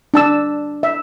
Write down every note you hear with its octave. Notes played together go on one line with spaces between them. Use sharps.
D4 A5 E6
E5